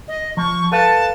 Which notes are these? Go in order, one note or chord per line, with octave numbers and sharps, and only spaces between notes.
D#5
F3 C#6
A4 B4 F5 A5